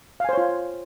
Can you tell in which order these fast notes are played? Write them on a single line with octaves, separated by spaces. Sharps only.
F5 G#5 C5 C#5 F4